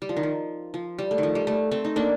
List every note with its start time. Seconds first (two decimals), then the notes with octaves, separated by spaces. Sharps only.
0.02 G3
0.09 F3
0.17 D#3
0.23 F3
0.74 F3
0.99 G3
1.11 A3
1.18 D#3
1.23 F3
1.35 G3
1.47 A3
1.71 A3 C4
1.85 D#4
1.96 A#3 D4